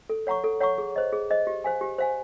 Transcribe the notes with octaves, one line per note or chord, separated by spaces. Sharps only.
A4
C#5 F#5 A#5 C#6
A4
C#5 F#5 A#5 C#6
G#4
C5 D#5
G#4
C5 D#5
G4
C5 F5 G#5
G4
C5 F5 G#5